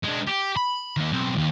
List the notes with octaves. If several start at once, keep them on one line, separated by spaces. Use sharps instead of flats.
G#3 D4
G4
B5
D#3 A#3
B1 C4
D#2